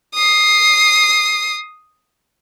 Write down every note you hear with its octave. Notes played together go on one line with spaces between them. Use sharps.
D#6 C7